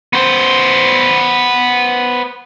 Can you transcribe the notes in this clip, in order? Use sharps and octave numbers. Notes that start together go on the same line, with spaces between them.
B3 C5